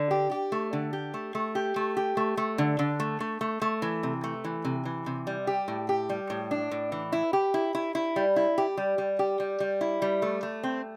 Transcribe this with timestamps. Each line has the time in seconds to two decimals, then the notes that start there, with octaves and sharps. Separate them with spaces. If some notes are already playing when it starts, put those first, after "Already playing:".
Already playing: D3
0.11 G4
0.31 G4
0.52 A3
0.73 D3
0.93 G4
1.14 A3
1.35 A3
1.55 G4
1.76 A3
1.97 G4
2.17 A3
2.37 A3
2.58 D3
2.79 D3
3.00 A3
3.20 A3
3.41 A3
3.62 A3
3.82 E3
4.03 C3
4.24 A3
4.44 E3
4.65 C3
4.85 E3
5.06 C3
5.27 G3
5.47 G4
5.68 A2
5.89 G4
6.09 G3
6.30 A2
6.51 D4
6.71 A2
6.92 E3
7.12 E4
7.33 G4
7.54 E4
7.75 E4
7.95 E4
8.16 G3
8.36 E4
8.58 G4
8.77 G3
8.98 G3
9.19 G4
9.40 G3
9.60 G3
9.81 E4
10.02 G3
10.22 A3
10.43 A3
10.63 C4